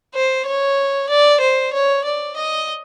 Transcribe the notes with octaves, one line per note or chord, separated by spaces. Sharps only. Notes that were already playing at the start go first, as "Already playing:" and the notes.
C5
C#5
D5
C5
C#5
D5
D#5